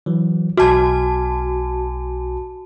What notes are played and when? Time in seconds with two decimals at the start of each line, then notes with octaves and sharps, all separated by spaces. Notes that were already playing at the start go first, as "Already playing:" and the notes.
0.06 E3 F#3
0.57 B1 F#4 G#5 A5 D6